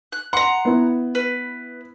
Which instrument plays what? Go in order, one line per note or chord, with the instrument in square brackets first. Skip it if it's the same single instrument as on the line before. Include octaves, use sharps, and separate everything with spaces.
[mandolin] F#6
[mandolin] F#5 A#5 [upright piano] C6
[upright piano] B3 E4
[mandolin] B4